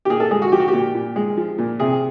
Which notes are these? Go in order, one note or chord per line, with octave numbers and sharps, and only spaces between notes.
G4
A#2 G#4
A4
G#3 G#4
F#4
F3 G4
F#4
G4
A#2
A#2
G#3
F3
A#2
C3 G#4